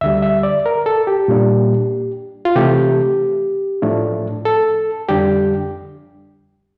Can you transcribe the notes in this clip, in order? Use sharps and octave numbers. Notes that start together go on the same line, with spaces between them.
D2 D3 G3 E5
E5
D5
A#4
A4
G4
A#2 G3 A#3 D4
F4
C3 E3 A3 G4
A2 F3 A3 D4
A4
F2 D3 G3 D4 G4